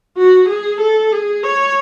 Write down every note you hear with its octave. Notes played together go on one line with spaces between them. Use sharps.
F#4
G#4
A4
G#4
C#5